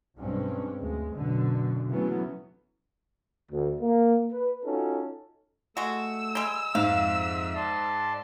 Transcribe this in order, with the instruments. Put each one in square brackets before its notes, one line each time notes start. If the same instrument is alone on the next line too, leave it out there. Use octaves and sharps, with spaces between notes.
[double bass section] B1 G2 G#3 C4 C#4
D2 C#3 G#3
B1 F#2 B2 D3
C#3 E3 F#3 A3 B3 C#4
[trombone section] D2
A#3
B4
C#4 D#4 F4 F#4 A4
[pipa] G#3 F#4 [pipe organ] A3 [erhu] E6
[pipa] G3 G#3
[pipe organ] F2 E5 [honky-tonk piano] G#2 [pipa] F5
[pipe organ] D5 A5 C6